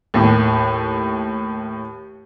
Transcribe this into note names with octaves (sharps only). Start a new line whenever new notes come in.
D#2 A2